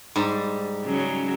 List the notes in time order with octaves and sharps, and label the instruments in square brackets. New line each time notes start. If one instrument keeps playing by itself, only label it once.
[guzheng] G#2 G3
[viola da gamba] C#3 F#3